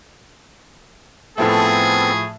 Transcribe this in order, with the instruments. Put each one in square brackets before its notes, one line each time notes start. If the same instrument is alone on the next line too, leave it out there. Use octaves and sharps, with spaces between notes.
[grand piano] A2 F3 A3 [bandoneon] B3 C4 A4 [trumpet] G#4